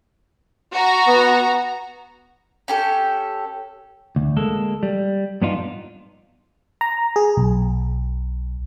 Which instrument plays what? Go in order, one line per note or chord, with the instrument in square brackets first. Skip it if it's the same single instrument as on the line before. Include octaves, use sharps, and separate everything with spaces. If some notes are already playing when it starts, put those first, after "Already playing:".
[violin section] F#4 A#5
[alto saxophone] B3
[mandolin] C#4 G4 A4
[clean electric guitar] D2
G#3 A#3 A4
G3
G2 B3 D4 D#4 F4
[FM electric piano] A#5
G#4
B1